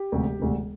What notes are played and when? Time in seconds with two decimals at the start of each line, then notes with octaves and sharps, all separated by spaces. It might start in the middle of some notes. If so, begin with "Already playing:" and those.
Already playing: G4
0.12 E1 D2 C3
0.40 E1 D2 C3